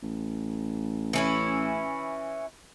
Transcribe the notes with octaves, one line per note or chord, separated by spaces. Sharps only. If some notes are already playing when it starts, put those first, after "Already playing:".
A1
E3 C#4 E4